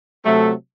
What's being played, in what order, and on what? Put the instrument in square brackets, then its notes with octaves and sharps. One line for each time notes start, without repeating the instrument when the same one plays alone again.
[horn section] C3 F#3 A3